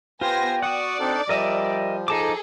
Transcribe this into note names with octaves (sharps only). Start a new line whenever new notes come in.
B3 F4 G4 C5 G5 G#5 A#6
F#4 D5 F#5 C#6 D#6
C4 D4 D#4 A4
F3 G3 A#4 D#5 E5
D#4 G#4 A4 A5 D6